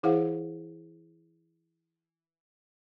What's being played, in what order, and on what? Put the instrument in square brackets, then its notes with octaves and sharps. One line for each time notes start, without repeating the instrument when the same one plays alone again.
[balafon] E3 E4 G#4 C5 F5 F#5